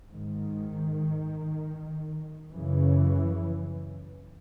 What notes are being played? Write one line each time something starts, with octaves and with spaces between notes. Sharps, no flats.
G#2 D#3
F#2 C#3 E3